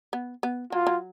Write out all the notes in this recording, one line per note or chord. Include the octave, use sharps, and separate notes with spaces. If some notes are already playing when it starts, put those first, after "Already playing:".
B3
B3
F#3 F4
F#3